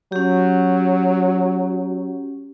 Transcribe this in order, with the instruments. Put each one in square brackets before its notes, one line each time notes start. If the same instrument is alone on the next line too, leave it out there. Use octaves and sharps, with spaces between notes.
[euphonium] F#3 [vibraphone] C#4 G4